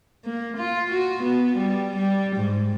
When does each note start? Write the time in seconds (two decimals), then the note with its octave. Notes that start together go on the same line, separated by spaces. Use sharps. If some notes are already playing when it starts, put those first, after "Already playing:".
0.25 A#3
0.58 F4
0.91 F#4
1.23 B3
1.57 G3
1.97 G3
2.36 G#2